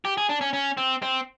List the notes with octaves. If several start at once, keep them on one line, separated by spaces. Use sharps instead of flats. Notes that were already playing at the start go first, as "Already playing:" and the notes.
G4
G#4
D4
C#4
C#4
C4
C4